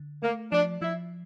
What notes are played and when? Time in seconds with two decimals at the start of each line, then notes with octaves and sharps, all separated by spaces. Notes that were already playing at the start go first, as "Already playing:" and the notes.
Already playing: D3
0.22 A3 A#3
0.52 F3 D4
0.81 F3 E4